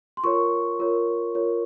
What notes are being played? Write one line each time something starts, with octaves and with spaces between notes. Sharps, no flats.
C6
F4 A#4 C#5 C#6
F4 A#4 C#5
F4 A#4 C#5